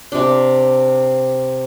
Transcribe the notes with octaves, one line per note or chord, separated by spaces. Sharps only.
C3 D4